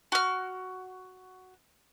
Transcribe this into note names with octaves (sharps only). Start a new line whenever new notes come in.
F#4 F6